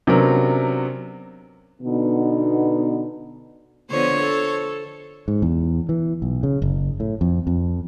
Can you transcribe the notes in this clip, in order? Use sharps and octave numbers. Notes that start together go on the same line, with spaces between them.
C3 F#3 B3 C#4 D4 A#4
B2 D3 B3 D#4
D3 F3 B3 C5 C#5
A4
G#2
E2
E3
B1
C#3
F#1
A2
F2
F2